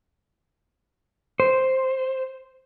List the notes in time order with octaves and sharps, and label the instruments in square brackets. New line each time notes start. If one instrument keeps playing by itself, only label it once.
[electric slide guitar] C5